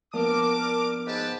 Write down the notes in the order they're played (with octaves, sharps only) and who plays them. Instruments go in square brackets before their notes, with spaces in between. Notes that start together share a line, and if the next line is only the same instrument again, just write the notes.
[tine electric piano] F3 A#3 B3 [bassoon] D4 [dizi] A#4 [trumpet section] D6
[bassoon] G#2 [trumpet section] G4 B4 A5